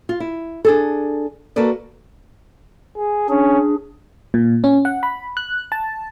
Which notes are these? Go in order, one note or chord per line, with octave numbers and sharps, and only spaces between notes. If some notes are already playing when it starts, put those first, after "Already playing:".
F4
E4
D4 G#4 A4
A#3 F#4 A4 B4 D5
G#4
C#4 D4 G#4
A#2
C#4
F#5
B5
F#6
A5